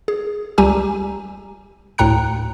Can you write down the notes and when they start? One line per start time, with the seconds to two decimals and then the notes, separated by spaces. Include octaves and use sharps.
0.08 G#4
0.58 C#2 G3 G4 G#5 A#5 E6
1.98 D2 A2 G5 A#5 F#6 C#7